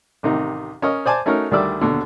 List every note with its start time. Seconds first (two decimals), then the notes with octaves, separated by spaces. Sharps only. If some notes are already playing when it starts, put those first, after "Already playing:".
0.23 A1 C3 D#3 D#4
0.82 C#4 A#4 D#5 C#6
1.06 C5 D5 G#5 A5
1.26 A3 C#4 D#4 F#4 A#4
1.51 D2 D#3 G3 A3 D5 E6
1.81 D#2 B2 D3